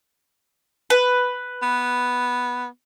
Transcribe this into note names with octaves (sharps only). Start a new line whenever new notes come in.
B4
B3